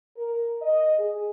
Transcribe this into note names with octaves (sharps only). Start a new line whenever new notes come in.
A#4
D#5
G#4